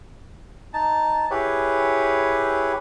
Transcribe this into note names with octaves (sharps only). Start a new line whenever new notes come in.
D#4 A5
E4 G4 G#4 B4 C#5